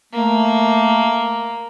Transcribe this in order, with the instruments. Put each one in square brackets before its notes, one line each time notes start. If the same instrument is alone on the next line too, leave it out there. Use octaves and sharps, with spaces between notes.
[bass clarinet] A3 [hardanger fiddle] A#3